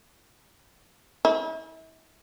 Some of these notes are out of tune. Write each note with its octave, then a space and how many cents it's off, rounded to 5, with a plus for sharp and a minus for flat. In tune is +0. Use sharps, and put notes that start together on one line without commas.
E4 -40